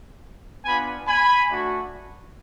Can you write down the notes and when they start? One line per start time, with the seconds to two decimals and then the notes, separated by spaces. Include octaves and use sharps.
0.65 B3 D4 F4 G#5 B5
1.07 G#5 B5
1.49 A3 D4 F#4